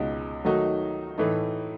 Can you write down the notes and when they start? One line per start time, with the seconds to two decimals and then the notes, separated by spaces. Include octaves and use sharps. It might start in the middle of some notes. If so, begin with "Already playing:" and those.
Already playing: C#2 B2 G#3 D#4
0.45 D#3 F#3 A3 D#4 F#4
1.18 A2 E3 A3 D#4